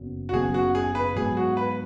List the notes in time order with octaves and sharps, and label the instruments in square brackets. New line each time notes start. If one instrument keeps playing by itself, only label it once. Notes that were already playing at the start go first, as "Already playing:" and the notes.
Already playing: [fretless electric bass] F#1 F#2 B3
[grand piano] F#4
[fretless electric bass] F#1 F#2 C#3 B3 [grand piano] G#4
[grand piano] F#4
G#4
B4
[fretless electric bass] G#2 F#3 B3 [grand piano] G#4
[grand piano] F#4
B4